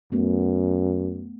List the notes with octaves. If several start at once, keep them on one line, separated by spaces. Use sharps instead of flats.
F#2 A3 B3